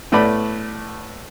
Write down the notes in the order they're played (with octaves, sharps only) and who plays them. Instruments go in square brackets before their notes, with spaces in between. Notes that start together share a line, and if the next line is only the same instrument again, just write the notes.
[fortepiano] A2 A3 B3 D5 B5